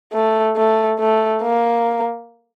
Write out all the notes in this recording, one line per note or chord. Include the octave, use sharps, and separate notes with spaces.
A3
A3
A3
A#3